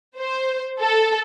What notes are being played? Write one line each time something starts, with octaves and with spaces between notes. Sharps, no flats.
C5
A4